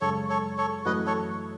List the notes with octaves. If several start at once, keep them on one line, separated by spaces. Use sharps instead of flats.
F#2 C#3 G#3 A4 C#5
A4 C#5
A4 C#5
F#2 E3 A3 C#4 F#4 B4 D#5
A4 C#5